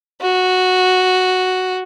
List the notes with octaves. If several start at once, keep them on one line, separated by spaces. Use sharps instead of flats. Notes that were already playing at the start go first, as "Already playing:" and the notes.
F#4